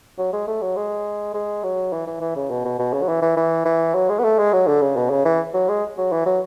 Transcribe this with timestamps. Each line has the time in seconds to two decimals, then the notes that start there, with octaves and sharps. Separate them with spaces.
0.18 F#3
0.33 G#3
0.48 A3
0.62 F#3
0.76 G#3
1.34 G#3
1.63 F#3
1.92 E3
2.07 E3
2.21 E3
2.36 C#3
2.50 B2
2.65 B2
2.79 B2
2.93 C#3
3.02 F#3
3.08 E3
3.22 E3
3.37 E3
3.65 E3
3.95 F#3
4.09 G#3
4.19 B3
4.24 A3
4.39 G#3
4.53 F#3
4.67 D3
4.82 C#3
4.96 B2
5.10 C#3
5.25 E3
5.54 F#3
5.69 G#3
5.98 F#3
6.12 E3
6.26 F#3